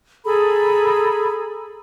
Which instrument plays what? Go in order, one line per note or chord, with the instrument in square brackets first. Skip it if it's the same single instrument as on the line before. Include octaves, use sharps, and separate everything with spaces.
[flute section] G#4 A4 A#5 B5